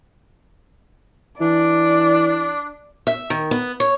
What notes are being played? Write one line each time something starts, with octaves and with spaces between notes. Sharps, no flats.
E3 D4 D5
E5
D#3
B3
C#5